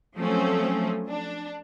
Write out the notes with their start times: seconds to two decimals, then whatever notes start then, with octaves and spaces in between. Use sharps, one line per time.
0.16 F3 F#3 A3 C4 C#4
1.08 D4